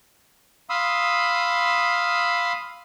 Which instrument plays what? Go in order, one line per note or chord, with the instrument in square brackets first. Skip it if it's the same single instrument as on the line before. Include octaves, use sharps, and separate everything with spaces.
[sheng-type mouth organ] F5 B5 C6 D#6 E6